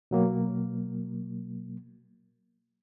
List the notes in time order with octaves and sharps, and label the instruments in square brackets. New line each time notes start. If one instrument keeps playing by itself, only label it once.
[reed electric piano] B2 F#3 A#3